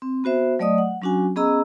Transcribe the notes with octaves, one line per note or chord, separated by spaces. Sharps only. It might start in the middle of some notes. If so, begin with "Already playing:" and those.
C4
B3 F#4 C5 E5
F#3 A3 D5 D#5 D#6
F#5
F#3 C#4 D4 F#4 G#5
B3 C#4 G#4 D#5 A#5 E6